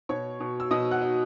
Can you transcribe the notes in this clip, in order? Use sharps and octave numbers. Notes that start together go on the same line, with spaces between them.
B2 C#5 C#6
B2
E6
B2 D#5 D#6
F#5 F#6
D#4